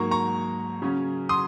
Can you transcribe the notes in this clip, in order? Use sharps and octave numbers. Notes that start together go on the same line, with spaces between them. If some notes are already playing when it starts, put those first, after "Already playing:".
Already playing: G#2 F#3 A#3 A#5 C#6
A#5 C#6
C#3 F#3 C#4
C6 D#6